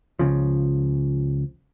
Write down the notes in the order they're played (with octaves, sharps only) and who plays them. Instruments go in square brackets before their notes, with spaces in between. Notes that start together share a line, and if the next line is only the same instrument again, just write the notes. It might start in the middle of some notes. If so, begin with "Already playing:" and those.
[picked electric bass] C#2 C#3 F3